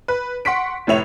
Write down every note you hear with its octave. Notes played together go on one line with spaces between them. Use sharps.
B4
F#5 C6 C#6 B6 D7
F1 A2 E4 C#5 E5 F7